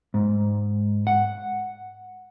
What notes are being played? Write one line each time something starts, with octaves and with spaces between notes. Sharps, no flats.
G#2
F#5